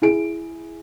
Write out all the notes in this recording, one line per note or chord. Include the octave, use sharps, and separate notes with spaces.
E4 G#4 D7